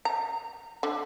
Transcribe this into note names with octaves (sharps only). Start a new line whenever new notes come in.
A#5
D3